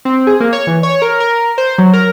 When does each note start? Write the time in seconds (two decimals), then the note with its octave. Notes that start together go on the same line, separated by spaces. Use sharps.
0.05 C4
0.27 G#4
0.40 A#3
0.53 C#5
0.67 E3
0.83 C#5
1.02 A#4
1.20 A#4
1.58 C5
1.78 F#3
1.93 A#4